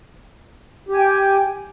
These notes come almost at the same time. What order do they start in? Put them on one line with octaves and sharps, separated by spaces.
G4 G#5 G5